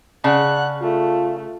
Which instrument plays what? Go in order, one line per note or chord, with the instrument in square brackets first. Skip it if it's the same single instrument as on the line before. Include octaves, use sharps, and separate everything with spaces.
[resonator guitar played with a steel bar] C#3 [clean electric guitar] G#4 D5 A5 [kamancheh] F#5 F#6
[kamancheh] A3 [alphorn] F4